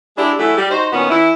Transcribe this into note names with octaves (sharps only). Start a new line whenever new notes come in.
G#3 D4 E4 G4 G#4
E3 F#3 A3 E4 G#4
G3
D#4 F#4 C5
A#2 D#3 B3 C#4 F#4
E3 E4